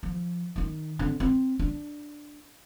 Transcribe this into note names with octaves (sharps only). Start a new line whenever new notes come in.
F3
D#3 D#4
D3 C4
C4
D4